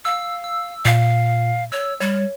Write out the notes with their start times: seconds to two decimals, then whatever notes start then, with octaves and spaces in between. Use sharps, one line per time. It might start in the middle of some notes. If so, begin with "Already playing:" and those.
0.05 F5 E6
0.44 E6
0.85 A#2 F5
1.72 C#5 E6
2.00 G3 C#5